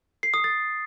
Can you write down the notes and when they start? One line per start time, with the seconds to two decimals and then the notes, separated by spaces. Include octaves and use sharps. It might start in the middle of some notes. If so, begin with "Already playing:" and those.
0.23 C7
0.34 D#6
0.44 A6